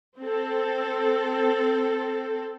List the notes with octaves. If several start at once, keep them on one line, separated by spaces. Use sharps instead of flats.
C4 A4